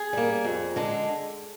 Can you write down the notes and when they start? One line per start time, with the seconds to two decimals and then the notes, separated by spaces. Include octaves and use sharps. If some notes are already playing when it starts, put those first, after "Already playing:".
Already playing: G#4
0.13 G3 A#3
0.44 F2
0.76 D3 G#3